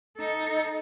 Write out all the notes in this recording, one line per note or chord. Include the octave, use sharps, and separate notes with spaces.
D#4 A4